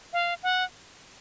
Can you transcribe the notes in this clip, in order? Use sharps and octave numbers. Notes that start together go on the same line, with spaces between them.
F5
F#5